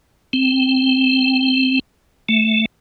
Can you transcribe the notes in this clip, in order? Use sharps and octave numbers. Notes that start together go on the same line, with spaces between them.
C4
A3